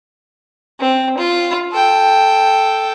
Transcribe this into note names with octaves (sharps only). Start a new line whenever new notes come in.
C4
F4
A4 G5